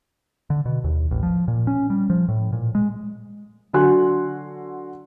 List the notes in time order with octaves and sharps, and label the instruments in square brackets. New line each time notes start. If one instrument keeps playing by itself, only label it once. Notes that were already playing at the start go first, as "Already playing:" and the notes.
[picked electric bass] D3
B2
D#2
A1
F3
A#2
C#4
G3
F3
A2
A#2
G#3
[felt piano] D3 F#3 F#4 G#5 C6 F#6